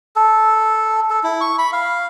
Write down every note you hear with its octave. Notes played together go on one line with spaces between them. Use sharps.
A4
A4
E4
C#6
B5
F5